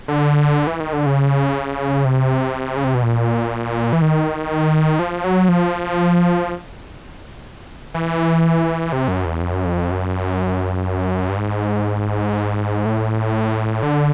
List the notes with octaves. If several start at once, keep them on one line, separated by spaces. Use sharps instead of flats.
D3
E3
D#3
D3
C#3
C3
C#3
C3
B2
A#2
E3
D#3
F3
F#3
F3
E3
C3
F#2
E2
F2
F#2
F2
F#2
G2
G#2
A2
D3